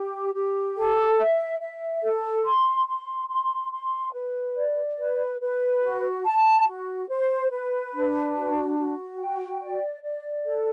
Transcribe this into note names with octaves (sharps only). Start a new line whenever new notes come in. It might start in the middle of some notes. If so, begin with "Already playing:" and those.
Already playing: G4
G4
A4
E5
E5
A4
C6
C6
C6
C6
B4
D5
B4
B4
F#4
A5
F#4
C5
B4
D4
F#4
F#4
G5
D5
D5
A4